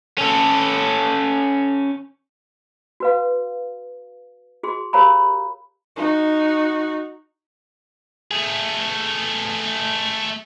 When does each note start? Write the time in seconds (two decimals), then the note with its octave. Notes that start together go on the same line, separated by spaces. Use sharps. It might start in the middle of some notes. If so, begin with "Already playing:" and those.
0.18 C#4 A4
3.00 F#4 B4 F5
4.63 F#4 G#4 C6
4.93 G4 A#4 C#5 F5 A#5 B5
5.97 D#4 F#4
8.31 A3 G#4